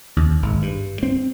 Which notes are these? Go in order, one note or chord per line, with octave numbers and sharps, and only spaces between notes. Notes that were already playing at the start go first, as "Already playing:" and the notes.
D#2
G#1
G2
C4